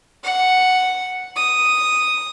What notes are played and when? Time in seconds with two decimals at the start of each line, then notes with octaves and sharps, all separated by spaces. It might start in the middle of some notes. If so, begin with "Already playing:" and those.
0.24 F#5
1.36 D#6